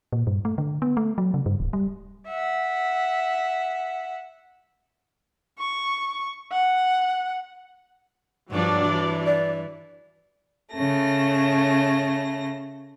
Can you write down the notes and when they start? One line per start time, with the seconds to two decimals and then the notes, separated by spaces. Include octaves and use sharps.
0.13 A#2
0.27 G2
0.45 A3
0.58 D3
0.82 B3
0.97 A3
1.18 F#3
1.34 C#3
1.46 G2
1.60 D1
1.73 G3
2.27 E5 F#5
5.58 C#6
6.52 F#5
8.51 G2 F3 F#3 D4 D5
8.84 E3
9.26 D5
10.73 C#3 A3 A#6